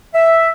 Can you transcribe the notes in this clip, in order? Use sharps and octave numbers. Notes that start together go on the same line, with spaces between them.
E5